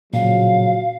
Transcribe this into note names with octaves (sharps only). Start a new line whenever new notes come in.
A#2 C#3 F3 F#3 F5